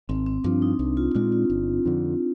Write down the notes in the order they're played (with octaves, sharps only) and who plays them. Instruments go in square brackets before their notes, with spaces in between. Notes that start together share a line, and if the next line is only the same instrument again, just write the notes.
[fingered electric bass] G#1 [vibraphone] C4
[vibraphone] C4
[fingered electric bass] G2 F3 [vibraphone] D4
[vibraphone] D#4
[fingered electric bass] C2
[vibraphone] F4
[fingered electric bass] A#2 G#3 D4 [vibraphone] F4
[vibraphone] F4
[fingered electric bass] G1
F2 D3